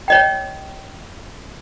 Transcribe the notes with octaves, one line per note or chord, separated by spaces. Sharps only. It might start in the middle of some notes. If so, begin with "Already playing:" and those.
C#5 D#5 G5